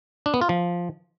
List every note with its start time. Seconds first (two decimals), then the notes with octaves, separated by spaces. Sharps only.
0.26 D4
0.34 B3
0.41 F4
0.49 F3